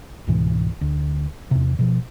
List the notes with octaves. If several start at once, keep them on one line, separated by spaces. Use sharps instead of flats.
C#2 G#2 B2 E3
D2
E2 C3
B2 F3